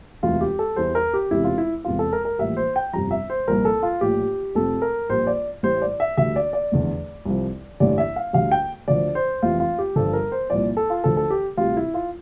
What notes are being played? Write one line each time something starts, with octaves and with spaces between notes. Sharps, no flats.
E1 D2 C3 E3 F4
G4
A4
E2 E3 G3 C5
A#4
G4
E1 E2 C3 G3 E4
F4
E4
E1 E2 C3 G3 F4
A4
A#4
A#4
A#1 A2 E3 G3 E5
C5
G5
G1 F2 C3 G3 A#5
E5
C5
C2 A#2 F3 A#4
A4
F4
A#1 A2 G3 G4
F1 F2 C3 A4
A#4
A#1 A#2 G3 C5
D5
A1 A2 G3 C5
D5
E5
D2 D3 G3 E5
D5
D5
F1 E2 D3
C2 C3 F3
A1 G2 D3 G3 D5
E5
F5
D2 D3 G3 F5
G5
D2 D3 F3 D5
C5
F1 F2 E3 G3 F4
F4
G4
G1 G2 D3 F3 A4
A#4
C5
C2 A#2 F3 D5
A4
F4
D2 D3 F3 A4
A4
G4
D2 C3 G3 F4
E4
F4